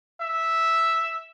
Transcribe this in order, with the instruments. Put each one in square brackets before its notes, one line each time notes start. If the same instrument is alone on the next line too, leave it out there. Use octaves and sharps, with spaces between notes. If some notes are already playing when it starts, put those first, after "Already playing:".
[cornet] E5